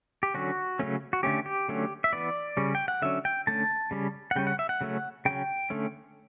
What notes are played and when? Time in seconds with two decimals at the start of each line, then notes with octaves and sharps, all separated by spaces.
0.23 G4
0.34 D3 F#3 C#4 F#4
0.79 C#3 F#3 A3 C#4
1.13 F#4
1.23 D3 A3 C#4 G4
1.46 G4
1.69 D3 F#3 A3 C#4
2.04 E5
2.13 E3 B3 D5
2.57 C#3 G3 C#4
2.75 G5
2.88 F#5
3.02 D3 F#3 C#4 E5
3.25 G5
3.47 D3 A3 C#4 A5
3.91 C#3 G3 C#4
4.31 F#5
4.36 C#3 G3 C#4 G5
4.47 F#5
4.59 E5
4.69 F#5
4.81 C#3 F#3 A3 C#4
5.25 C#3 F#3 C#4 G5
5.70 D3 A3 C#4